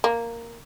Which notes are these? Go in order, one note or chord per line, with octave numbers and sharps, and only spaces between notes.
A#3